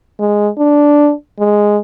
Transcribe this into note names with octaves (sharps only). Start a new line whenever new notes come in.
G#3
D4
G#3